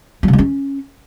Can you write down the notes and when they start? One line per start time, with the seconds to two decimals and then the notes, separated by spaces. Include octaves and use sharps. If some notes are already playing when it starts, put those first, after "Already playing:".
0.23 G3
0.28 C3
0.33 G#3
0.38 C#4